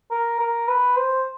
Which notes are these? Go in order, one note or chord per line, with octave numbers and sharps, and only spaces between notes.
A#4
A#4
B4
C5